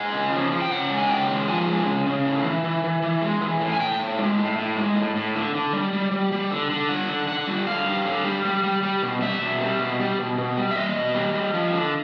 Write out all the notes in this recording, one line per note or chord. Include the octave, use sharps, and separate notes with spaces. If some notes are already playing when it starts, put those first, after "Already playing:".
Already playing: G#3 F#5
C#3
F3
F3
G5
C#3 F#5
G#3
G#5
C#3 G5
G#3
F3 G#5
G#3
C#3
C#3
A2
E3
E3
E3
E3
G#3
E3
A2
G#5
A2 G5
A2
G#3
A2
A2
G#3
A2
A2
D3
D3
G3
G3
G3
G3
D3
D3
G3 F#5
D3
D3 F#5
G3
D3 F5
G3
D3
G3
G3
G3
G3
B2
G3 E5
B2
G3
B2
G3
B2
B2
G3
E5
G3 D#5
B2
G3
G3
F3
D3